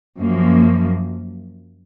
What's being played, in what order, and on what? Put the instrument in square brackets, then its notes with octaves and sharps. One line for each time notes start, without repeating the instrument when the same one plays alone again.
[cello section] F#2 F3 A#3